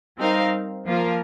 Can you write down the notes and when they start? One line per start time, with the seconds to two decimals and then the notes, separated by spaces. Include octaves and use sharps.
0.18 G3 C4 D#4 A#4 F5
0.86 F3 A#3 F4 A#4